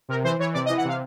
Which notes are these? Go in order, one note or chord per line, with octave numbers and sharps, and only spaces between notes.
C3 A#4
E3 C5
E3 C#5
C3 D5
D#5
E3
F#5
C3 F5